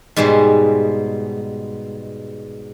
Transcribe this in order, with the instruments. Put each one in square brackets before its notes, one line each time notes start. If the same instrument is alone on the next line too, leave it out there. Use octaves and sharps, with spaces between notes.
[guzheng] G#2 B2 G3 G#3